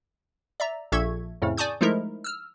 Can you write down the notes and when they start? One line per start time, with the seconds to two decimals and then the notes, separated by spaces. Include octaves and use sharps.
0.60 D5 E5 A#5
0.92 A#1 A#2 A4 E5 C#6 G#6
1.42 F2 A2 C#3
1.57 D5 G#5 A5 C#6 D#6 G6
1.81 F3 G#3 A3 D#4 E4 A#4
2.24 E6 F6